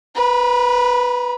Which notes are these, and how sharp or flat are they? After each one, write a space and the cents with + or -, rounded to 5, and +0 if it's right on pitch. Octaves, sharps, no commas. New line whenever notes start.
B4 +0 A#5 +45